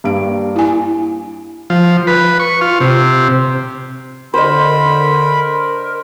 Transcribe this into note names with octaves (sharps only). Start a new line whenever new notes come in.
G2 A#3 D7
E4 G#5
F3
B4
C#6
F4
C3
D3 A#4 C5 D#5 B5